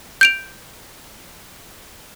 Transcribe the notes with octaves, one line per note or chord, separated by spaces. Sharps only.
G6 D7 F7